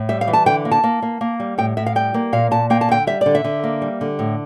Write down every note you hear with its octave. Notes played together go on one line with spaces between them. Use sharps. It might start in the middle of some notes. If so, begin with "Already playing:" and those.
Already playing: A2
G3 E5
F5
E3
A5
D3 G5
A#3
A5
A#3
A#3
A#3
G3
A2 G5
A2 E5
F5
G3 G5
A#3
A#2 F5
A#2 A5
A#3 G5
A5
D3 G5
G3 E5
D3 D5
E5
D3
A#3
G3
D3
A2